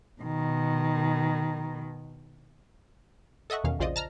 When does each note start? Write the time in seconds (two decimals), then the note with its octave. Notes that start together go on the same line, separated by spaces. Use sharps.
0.22 B2 D#3
3.50 A4 D#5 E5 F#5 C#6
3.64 E2 B2 D#3 C#4 F5
3.79 A#1 C#3 F4 C5 D5 D#5
3.96 A5 A#5 F6